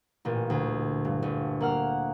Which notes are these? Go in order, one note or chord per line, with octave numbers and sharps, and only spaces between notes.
A1 A#2
D2
G2
G1
A#3 F#5 F6